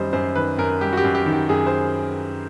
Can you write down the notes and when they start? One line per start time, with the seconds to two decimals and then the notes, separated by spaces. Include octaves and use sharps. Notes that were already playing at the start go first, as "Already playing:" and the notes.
Already playing: F#2 D#3 G3 C5 D#5
0.13 F#2 C5
0.36 D#3 B4
0.58 F#2 A#4
0.81 G3 G4
0.93 F#4
0.97 G4
1.04 F#2
1.15 G4
1.26 D#3
1.32 G4
1.49 F#2 G#4
1.66 C5